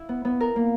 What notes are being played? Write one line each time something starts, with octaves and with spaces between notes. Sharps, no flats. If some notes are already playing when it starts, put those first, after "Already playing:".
Already playing: E4
B3
B3
A#4
A#3